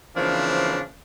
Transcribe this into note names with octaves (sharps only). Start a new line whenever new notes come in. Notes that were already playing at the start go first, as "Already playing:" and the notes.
C#3 E3 F3 A#3 C4 D4